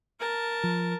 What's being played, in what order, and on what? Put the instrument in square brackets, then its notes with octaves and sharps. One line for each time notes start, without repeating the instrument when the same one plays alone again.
[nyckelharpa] A#4 A5
[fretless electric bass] F3